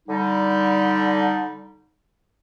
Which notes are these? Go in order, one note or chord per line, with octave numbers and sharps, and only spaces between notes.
D3 G3 D#4